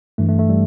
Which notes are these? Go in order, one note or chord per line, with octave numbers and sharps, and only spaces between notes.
G2 E3 A3
A3
A3
G3